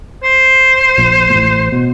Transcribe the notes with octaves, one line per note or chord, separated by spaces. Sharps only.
C5
A#1 A#2
A#2
A1 A2
B2